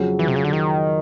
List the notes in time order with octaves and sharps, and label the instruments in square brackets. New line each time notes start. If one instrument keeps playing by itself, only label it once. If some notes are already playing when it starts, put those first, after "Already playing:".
Already playing: [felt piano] F2 C#3 F#3
[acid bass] E3
C3
C#3
D3
D#3